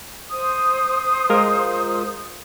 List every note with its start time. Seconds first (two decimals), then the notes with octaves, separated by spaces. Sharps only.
0.30 C5 D#6
1.29 G#3 F4 A#4